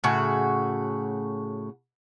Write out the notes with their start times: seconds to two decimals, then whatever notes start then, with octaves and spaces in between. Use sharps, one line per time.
0.04 A2 C#3 F#4